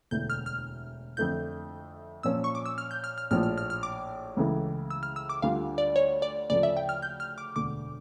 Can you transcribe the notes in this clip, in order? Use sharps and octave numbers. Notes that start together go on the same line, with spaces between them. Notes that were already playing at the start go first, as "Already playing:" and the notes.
E1 D2 D3 A3 E4 G6
F6
F6
F2 D3 A3 E4 G6
A#2 F3 C#4 E6
C#6
D6
E6
F6
G6
F6
F6
A#1 A2 F3 F6
F6
F6
F6
D6
C#2 C#3 E3 A3
E6
F6
E6
D6
D2 D3 G3 D4 F4 F5
D5
C#5
D5
D2 C#3 F3 A3 D5
E5
G5
F6
G6
F6
D6
E1 D2 D3 D6